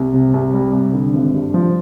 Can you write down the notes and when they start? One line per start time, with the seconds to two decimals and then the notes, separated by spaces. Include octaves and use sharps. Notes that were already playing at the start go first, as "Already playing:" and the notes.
Already playing: C2
0.14 C3
0.34 C2
0.54 G3
0.73 C2
0.93 D3
1.14 G#1
1.34 G2
1.54 F3